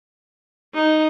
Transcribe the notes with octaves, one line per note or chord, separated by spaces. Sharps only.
D#4